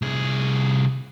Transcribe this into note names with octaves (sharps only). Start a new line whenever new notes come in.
C2 G#4